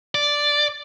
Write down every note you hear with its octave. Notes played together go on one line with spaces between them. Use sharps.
D5